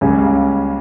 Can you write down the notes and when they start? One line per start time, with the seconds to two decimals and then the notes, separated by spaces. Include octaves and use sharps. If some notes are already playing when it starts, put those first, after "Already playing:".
0.01 C#2 C#3 G3 A#3 G#5
0.18 F5